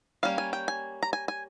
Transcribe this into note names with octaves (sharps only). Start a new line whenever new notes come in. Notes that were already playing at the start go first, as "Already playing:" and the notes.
G3 A#3 C#4 F5
G#5
G5
G#5
A#5
G#5
G#5